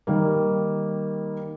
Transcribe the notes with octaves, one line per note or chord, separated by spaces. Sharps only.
D#3 G3 A#3